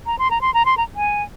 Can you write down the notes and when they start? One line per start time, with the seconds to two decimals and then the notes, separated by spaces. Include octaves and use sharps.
0.06 A#5
0.19 C6
0.31 A#5
0.41 C6
0.54 A#5
0.66 C6
0.77 A#5
0.96 G#5